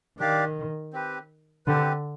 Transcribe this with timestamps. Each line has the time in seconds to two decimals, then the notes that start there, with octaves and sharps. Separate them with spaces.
0.19 D#3 D4 G4 D5 F5
0.93 C4 G4 B4
1.66 D3 C4 G4 B4